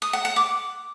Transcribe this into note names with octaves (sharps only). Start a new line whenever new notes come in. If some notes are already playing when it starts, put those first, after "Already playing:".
D#6
F#5
F#5
D6